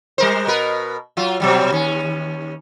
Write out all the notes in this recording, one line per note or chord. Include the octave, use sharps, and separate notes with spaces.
G3 A#4 C5
B2 A#4 B4
F#3 F4
B2 F#3 G3
D#2 C#4